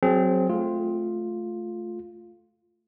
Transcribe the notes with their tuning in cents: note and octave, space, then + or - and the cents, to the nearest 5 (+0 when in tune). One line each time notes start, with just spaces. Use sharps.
F#3 +5 C4 +0 G#4 +25
A3 -15 F4 +5